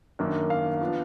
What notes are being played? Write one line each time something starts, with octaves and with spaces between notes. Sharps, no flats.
F#2 D#3 A#3 D4
F5
F3 B3 D4